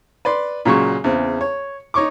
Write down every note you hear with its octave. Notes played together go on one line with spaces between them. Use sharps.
B4 D5 C6
A#2 C#3 F#3 G#3 C#6
E2 C#3 C4
C#5
D#4 C#5 C#6 D6